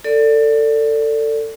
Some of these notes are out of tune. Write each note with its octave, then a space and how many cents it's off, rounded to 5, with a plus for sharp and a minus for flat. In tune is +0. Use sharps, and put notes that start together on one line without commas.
A4 +25 D5 -10